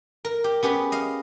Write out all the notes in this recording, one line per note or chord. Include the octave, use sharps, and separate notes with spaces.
A#4
G4
B3 C#4 G4 G#4 B4
D#5 F5